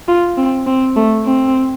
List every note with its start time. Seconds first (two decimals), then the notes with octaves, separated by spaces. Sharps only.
0.08 F4
0.38 C4
0.67 C4
0.96 A3
1.26 C4